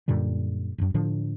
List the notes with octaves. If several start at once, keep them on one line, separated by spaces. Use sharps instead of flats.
F#2 A#2 D3 G3
D#1 F#2
A2 D3 F3 D4